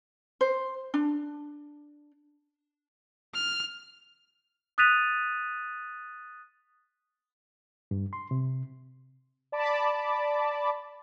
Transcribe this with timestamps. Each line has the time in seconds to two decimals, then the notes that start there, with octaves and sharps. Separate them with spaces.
0.41 C5
0.94 D4
3.35 F6
4.78 D#6 F#6 A6 B6 D#7 F7
7.91 G2
8.13 C6
8.31 C3
9.52 D5 A5 B5 D6